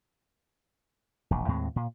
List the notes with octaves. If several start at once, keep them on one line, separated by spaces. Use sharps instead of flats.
E1 A#1
D#2 A2 G#3 C4
A#2